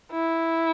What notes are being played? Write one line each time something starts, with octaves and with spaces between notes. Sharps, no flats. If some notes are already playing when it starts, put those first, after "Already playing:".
E4